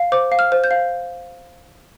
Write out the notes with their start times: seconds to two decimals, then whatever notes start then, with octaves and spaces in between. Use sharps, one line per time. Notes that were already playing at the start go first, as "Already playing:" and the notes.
Already playing: F5
0.12 C5 D6
0.32 F5
0.39 F6
0.52 C5
0.64 G6
0.71 F5